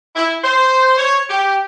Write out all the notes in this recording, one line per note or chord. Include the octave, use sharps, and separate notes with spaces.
E4
C5
C#5
G4